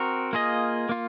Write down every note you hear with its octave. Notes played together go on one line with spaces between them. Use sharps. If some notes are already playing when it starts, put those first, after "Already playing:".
Already playing: C4 F#4 A#4
A#3 F4 G#4 D#5
A#3 F4